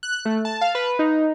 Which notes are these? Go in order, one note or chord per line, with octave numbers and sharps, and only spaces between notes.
F#6
A3
A5
F5
B4
D#4